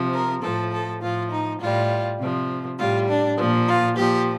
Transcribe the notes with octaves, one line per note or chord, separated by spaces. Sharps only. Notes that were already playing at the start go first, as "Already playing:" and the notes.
Already playing: C3 F3
A#4
A2 F3 A4
A4
A2 F3 F4
D#4
A2 G3 F4
C3 F3
A2 G3 F4
D4
A#2 F3
F4
A#2 F3 G4